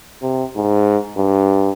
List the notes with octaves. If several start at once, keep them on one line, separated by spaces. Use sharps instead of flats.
C3
G#2
G2